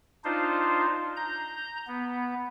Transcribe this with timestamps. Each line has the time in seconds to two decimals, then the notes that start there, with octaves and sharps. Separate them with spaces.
0.24 D4 D#4 F4 C5
1.17 A#5 G6
1.88 B3